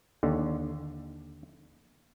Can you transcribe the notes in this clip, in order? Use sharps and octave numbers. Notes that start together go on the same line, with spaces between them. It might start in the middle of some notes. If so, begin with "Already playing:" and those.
D#2 D3